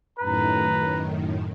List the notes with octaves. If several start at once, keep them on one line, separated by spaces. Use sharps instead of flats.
F#2 A2 D#3 B4 A#5